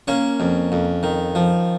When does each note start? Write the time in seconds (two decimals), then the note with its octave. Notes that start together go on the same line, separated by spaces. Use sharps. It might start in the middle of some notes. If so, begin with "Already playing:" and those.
0.08 A#3 C#4 C#5
0.40 F2
0.72 F2
1.03 D#3
1.35 F3